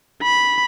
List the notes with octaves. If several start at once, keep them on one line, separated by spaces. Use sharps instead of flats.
B5